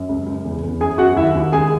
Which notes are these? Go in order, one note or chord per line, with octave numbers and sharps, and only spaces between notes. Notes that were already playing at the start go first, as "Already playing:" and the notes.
Already playing: F#2
C#2
C#2
E2
E2
F#2 G#4 G#5
F#2 F#4 F#5
D#2 E4 E5
D#2
C#2 G#4 G#5